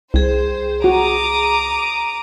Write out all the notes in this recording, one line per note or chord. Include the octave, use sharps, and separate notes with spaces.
C2 G#4 C5 G5
F#4 A#5 D6 D#6